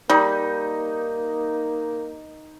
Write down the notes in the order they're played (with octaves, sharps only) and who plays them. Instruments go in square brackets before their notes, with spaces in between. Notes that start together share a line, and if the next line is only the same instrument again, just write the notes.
[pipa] G3 [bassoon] A#3 [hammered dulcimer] D#4